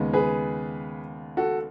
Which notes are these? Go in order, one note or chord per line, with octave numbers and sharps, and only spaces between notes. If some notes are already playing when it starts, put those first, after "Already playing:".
Already playing: D#2 C#3 G#3 B3
G#4 B4
F#4 A4